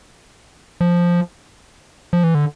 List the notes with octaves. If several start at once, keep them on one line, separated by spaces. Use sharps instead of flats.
F3
F3
E3
D3